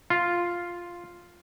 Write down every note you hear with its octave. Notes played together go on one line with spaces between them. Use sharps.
F4